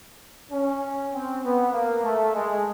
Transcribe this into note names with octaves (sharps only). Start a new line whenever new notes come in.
C#4
C4
B3
A#3
A3
G#3